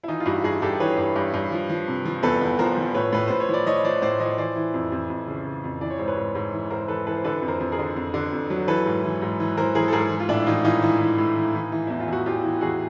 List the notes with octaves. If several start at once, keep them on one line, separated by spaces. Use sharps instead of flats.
E4
E3 D#4 F4
F4
G2 E4 F#4
G2 F#4 G#4
G2 G4 A4
E3 B4 C#5
G2
G2
G2
F3
F3
C3
F3
E2 A4 B4
E2
F3 A#4 C5
F3
A2 B4 C#5
A2 B4
A2 C5
C#5
F3 D5
F3 C#5 D#5
F3 C5 D5
A2 C5 D5
F3 C#5 D#5
E3 C5 D5
E3
F2
F2
F2
C#3
C#3
F2
E3 D5
C#5
G#2 C5
B4 C#5
G#2
G#2
E3
G#2 A#4 C5
E3 A4 B4
E3 A4 B4
C5
D3 A4 B4
F2
A#4 C5
F2
G#4 A#4
D3
F2
D3
F2
F#3
E3 A4 B4
G#2
E3
G#2
E3
E3 A#4 C5
E3 G#4 A#4
A4
G#2 G#4 A#4
E3
F4
A2 D4 E4
E3 D#4 F4
E3 D#4 F4
E3
E3
A2
E3
E3
E3
E2 E4
F4
E2 F#4
E2 F4 G4
E3
E2 F#4 G#4